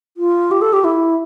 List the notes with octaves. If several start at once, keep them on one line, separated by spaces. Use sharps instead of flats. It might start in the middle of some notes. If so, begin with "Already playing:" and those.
F4
G4
A4
G4
E4